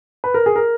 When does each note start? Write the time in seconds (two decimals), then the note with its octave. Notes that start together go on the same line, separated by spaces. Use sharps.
0.24 B4
0.34 A#4
0.46 G#4
0.56 A#4